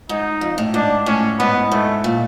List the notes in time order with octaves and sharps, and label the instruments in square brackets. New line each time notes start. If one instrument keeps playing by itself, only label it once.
[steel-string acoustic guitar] G#2 [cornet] D#4
[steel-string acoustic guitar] F2
A2
[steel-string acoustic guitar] G#2 [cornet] D4
[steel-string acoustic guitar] A2 [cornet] C#4
[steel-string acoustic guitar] G#2 [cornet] B3
[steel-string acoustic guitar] G#2 [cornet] A3
[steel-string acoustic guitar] A#2